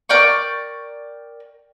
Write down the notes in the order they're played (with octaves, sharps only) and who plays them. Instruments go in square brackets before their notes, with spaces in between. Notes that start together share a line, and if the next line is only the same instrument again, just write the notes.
[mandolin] A#4 D5 G5 C#6